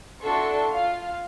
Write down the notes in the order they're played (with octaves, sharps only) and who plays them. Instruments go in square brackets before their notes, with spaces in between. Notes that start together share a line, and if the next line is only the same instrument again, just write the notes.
[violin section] D4 E4 F#4 A4 C6 C#6
F4 F5